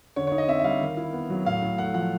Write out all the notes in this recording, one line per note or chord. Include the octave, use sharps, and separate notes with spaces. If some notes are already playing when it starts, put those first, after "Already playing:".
D3 C#5
C#5
D#4
D#5
C4 E5
E5
G3 F5
D#3
E4
B3
F#3
A2 F5
A2
A3 F#5
F3 F#5